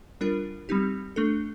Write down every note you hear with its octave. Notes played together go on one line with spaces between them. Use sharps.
G3 D4 F4 A#4
G3 C4 D#4 G4
A3 D4 A4